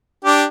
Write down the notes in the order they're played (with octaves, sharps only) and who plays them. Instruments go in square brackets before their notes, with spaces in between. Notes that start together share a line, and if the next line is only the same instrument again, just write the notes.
[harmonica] D4 G4